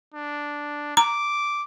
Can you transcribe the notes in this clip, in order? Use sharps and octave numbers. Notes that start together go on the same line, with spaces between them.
D4
A#5 D6